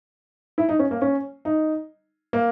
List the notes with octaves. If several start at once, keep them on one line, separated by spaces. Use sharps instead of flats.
E4
D#4
C#4
A#3
C#4
D#4
A#3